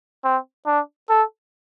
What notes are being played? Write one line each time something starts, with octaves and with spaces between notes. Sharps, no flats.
C4
D4
A4